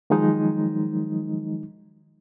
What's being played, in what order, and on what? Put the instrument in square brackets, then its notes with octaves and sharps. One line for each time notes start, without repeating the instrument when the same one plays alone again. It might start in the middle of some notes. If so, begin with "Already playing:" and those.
[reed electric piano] D#3 F3 F#3 G#3 D#4